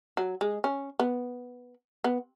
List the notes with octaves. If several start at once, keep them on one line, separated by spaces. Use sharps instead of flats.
F#3
G#3
C#4
B3
B3